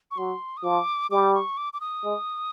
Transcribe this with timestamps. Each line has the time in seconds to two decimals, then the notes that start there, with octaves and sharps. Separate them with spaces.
0.11 C#6
0.18 F#3 C6
0.57 D#6
0.64 F3 D6
1.11 G3 D6
1.34 C#6
1.57 D6
1.73 D6
1.81 D#6
2.04 G#3